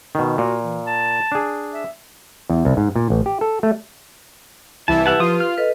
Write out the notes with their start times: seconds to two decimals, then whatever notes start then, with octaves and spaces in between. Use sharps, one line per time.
0.15 B2 D#3
0.38 A#2 F#4
0.62 E3
0.86 A5
1.32 D4 G#4
1.73 E5
2.50 E2
2.65 C2
2.77 G#2
2.96 A#2
3.10 A1
3.26 G4
3.41 A4
3.63 A3
4.88 C2 E3 E4 A5
5.06 G4 B4 E5 F#5 A5
5.20 F3 F4 D#6
5.40 F6
5.57 A4 B4 D#5